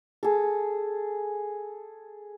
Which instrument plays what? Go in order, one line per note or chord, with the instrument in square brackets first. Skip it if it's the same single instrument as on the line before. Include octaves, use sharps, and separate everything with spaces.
[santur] G#4 A4